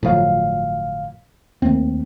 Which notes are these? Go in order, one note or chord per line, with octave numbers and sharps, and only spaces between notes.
G1 A2 F3 F#3 F5
D#2 D#3 A3 C4